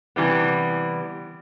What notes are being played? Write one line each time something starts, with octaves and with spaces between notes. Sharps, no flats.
C3 E3 G3 B3